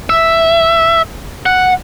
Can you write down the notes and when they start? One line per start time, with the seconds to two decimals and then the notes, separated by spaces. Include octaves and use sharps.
0.10 E5
1.46 F#5